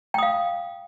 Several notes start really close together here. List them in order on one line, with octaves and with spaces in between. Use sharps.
G5 D#6 F5